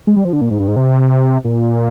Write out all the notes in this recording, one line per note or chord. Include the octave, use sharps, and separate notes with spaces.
G#3
G3
F3
D3
A#2
G#2
G2
G#2
C3
A#2